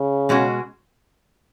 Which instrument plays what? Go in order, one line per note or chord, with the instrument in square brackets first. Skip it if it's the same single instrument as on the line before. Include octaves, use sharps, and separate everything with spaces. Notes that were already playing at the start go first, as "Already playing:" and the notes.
Already playing: [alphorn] C#3
[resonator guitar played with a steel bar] B2 G#3 C#4 F#4